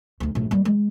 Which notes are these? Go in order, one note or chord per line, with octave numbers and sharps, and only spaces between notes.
D2 D#4
A#1 A2
G3 A#3
G#3